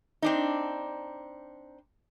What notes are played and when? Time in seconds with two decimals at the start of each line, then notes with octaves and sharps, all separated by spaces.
0.22 C4 D4 D#4